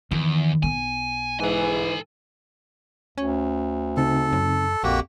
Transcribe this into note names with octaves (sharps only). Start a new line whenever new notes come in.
E2 D#3
B1 B3 G#5
G#2 E3 A4 G#5
D2 C#4
C#3 C4 D#4 A4
F#2
A#1 F2 A#3 F#4 G4